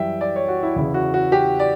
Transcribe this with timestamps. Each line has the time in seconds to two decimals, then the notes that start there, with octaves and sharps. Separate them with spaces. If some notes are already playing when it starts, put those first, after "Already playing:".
Already playing: F#2 E3 G3 E5 G5
0.21 D5
0.36 C#5
0.48 F#4
0.63 E4
0.76 E2 C#3 E3 E4
0.94 F#4
1.14 F#4
1.32 G4
1.60 D5